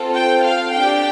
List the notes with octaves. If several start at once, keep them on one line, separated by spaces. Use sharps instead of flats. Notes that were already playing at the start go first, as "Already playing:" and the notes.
Already playing: C4 F4 A4
G5
F5
D4 G4 G5